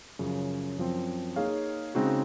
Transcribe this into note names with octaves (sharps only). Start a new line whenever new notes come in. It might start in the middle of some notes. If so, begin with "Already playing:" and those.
F#2 C#3 F3
F#2 F3 C4
A#3 D#4 G#4 C#5 F5
C#3 G#3 C4 D#4 F#4